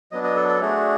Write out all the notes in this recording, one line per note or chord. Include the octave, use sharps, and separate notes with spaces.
F#3 B3 D4 D#5
D#5
A4
A4
A3 D4 F#4 G#4